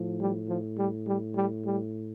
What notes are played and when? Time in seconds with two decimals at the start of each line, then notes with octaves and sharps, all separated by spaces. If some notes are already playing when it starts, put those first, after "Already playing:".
Already playing: A2 F3
0.20 G3
0.48 F3
0.77 G3
1.06 G3
1.36 G3
1.64 G3